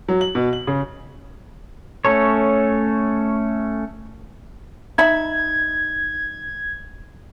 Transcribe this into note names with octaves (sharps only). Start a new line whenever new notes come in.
F#3
F#7
B2
F#7
C#3
A3 C#4 A4 C#5
D#4 E5 B5 G#6